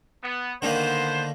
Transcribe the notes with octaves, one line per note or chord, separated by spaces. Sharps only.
B3
D3 D#3 A#3 B3 C5